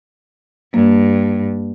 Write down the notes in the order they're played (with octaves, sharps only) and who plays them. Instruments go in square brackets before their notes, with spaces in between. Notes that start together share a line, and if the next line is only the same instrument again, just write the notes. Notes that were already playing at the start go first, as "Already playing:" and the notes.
[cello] G2 [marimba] A#3